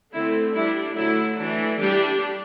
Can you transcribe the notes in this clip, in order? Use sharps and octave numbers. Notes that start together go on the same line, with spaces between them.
D3 A3 C4 E4
G3 D4 E4
D3 F#3 A3 E4
E3 A3 D4
G3 D4 G4